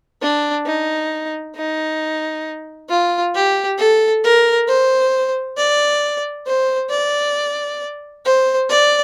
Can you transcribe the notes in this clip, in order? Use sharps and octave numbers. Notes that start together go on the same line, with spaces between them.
D4
D#4
D#4
F4
G4
A4
A#4
C5
D5
C5
D5
C5
D5